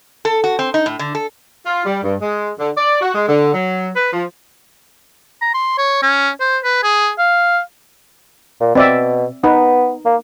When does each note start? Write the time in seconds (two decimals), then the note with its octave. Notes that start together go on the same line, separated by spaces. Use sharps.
0.25 A4
0.44 F#4
0.59 C4
0.74 D#4
0.86 A2
0.99 D3
1.15 A4
1.66 F4
1.86 G3
2.04 G2
2.22 G#3
2.59 D3
2.77 D5
3.01 F#4
3.15 G#3
3.28 D3
3.54 F#3
3.96 B4
4.13 F3
5.41 A#5
5.54 C6
5.78 C#5
6.02 C#4
6.40 C5
6.64 B4
6.83 G#4
7.19 F5
8.61 A#2
8.75 B2 C4 D5 E5
9.44 B3 D#4 B4
10.06 A#3